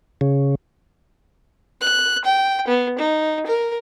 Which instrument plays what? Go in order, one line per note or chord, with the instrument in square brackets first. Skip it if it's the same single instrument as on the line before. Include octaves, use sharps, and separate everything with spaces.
[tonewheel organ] C#3
[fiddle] F#6
G5
B3
D#4
A#4